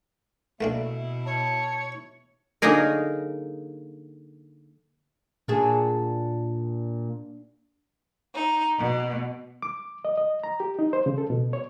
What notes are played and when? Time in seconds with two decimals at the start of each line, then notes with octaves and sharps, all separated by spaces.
0.61 B2 A3 A#3 D4 E4 E5
1.26 C#5 A5
2.62 D3 F#3 A#3 D#4 G#4 A#4
5.48 A#2 D4 F#4 G#4
8.34 D#4
8.78 B2
9.62 D6
10.05 D#5
10.18 D#5
10.44 A#5
10.60 G4
10.79 D#4
10.93 C5
11.06 C#3
11.18 A4
11.30 B2
11.53 C#5